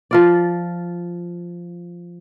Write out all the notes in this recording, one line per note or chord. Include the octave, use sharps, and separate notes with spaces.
F3 F4 D5